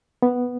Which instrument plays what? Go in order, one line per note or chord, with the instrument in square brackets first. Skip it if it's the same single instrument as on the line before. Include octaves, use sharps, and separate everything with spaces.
[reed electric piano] B3